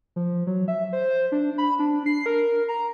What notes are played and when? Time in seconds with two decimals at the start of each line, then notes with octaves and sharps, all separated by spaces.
0.16 F3
0.47 F#3
0.68 E5
0.93 C5
1.32 D4
1.58 B5
1.79 D4
2.06 C7
2.26 A#4
2.69 A#5